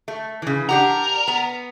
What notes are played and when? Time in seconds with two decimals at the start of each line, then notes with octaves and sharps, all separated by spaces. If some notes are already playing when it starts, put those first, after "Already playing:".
0.08 A3
0.42 C#3 E3
0.69 D4 G4 A#4 F#5
1.28 B3